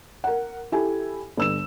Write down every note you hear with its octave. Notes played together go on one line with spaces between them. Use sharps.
A#4 F#5
E4 G4 A4 G#5
G1 E6 E7